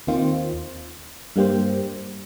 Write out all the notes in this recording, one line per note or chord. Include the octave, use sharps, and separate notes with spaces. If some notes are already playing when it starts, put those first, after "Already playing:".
D#2 D#3 C4 F4 C5
G2 G3 A#3 G4 C5